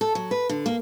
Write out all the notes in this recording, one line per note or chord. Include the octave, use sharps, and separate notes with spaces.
A4
F#3
B4
D3
A#3